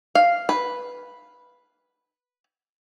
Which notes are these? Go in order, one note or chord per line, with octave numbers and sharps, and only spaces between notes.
F5
B4